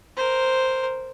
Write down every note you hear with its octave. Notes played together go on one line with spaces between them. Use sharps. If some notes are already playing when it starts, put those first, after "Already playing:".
A#4 C5